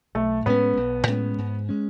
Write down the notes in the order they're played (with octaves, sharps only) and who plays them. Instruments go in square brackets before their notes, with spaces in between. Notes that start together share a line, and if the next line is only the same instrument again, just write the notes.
[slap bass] B1 [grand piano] A3
[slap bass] A2 G#3 C#4 [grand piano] B3
[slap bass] B1
A2 G#3 C#4
G#2
G#3 C#4